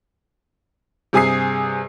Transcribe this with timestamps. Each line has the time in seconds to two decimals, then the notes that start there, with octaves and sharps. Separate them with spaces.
1.13 G2 C3 G#4 G#5 D#6 C7